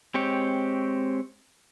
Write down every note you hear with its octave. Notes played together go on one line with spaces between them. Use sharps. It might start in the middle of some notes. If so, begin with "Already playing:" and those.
G#3 C4 G4 C#5